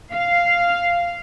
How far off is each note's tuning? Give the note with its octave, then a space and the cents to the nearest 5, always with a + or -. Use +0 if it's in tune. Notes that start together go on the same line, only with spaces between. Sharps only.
F5 -5